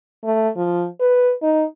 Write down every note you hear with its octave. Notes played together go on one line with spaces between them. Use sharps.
A3
F3
B4
D#4